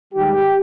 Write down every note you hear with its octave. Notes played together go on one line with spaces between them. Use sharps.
G#2 D#3 G3 G4